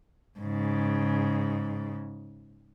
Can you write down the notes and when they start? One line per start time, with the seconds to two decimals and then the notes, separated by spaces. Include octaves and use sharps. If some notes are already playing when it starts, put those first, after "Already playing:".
0.39 G#2 C#3